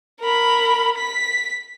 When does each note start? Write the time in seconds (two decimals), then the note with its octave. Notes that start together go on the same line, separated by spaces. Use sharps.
0.20 A#4 B5
0.98 B6